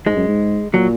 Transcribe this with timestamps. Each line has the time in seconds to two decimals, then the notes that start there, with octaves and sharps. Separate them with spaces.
0.06 G#2 G#3
0.16 F#2
0.28 G#2
0.73 A#2 F#3